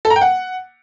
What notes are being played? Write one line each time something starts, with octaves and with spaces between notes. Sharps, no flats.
A4
A#5
G5
F#5